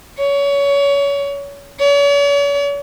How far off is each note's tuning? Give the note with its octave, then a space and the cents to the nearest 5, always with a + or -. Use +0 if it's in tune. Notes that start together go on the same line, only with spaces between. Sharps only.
C#5 +30
C#5 +45